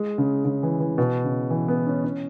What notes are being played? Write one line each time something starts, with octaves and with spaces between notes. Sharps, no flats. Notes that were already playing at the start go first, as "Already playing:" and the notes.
Already playing: G#3
C#3
C#3
E3
E3
B2
C#3
E3
B3
C#4
C#4